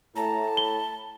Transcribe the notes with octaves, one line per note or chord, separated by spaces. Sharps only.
A2 A5 A#5
B5 G7